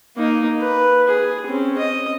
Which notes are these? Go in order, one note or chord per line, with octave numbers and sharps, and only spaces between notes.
A#3 D#4
B4
G#4
C4 C#4
D#5